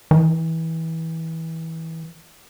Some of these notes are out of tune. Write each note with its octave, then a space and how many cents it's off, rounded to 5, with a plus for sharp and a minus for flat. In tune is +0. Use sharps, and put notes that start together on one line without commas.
E3 -25